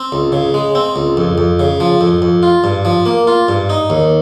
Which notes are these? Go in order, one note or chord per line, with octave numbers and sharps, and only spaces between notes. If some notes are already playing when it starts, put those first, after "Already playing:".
Already playing: C4
C#2
C#3
G#3
C4
C#2
F2
F2
C#3
F3
F2
F2
F4
G2
F3
A#3
F4
G2
D#4
D#2